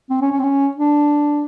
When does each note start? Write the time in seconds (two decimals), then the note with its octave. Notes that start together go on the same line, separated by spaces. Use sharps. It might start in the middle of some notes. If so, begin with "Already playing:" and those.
0.10 C4
0.21 C#4
0.32 C#4
0.39 C4
0.43 C#4
0.77 D4